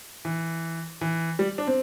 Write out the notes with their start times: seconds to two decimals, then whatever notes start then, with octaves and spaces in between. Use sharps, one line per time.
0.25 E3
1.01 E3
1.39 G3
1.58 D4
1.67 C4